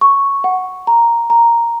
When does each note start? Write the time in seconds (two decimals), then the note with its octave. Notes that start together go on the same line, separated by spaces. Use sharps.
0.01 C#6
0.44 F#5
0.87 A#5
1.30 A#5